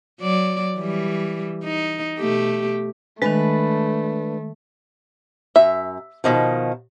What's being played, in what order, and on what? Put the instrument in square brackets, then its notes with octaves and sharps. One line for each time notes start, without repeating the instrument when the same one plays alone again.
[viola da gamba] F#3 D5
E3 G3
D#4
B2 A3 G4
[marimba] D#3 G#3 [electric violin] A3 [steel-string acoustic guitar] D4 B4
[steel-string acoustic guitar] F#2 [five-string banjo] E5
[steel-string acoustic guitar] B2 D#3 F3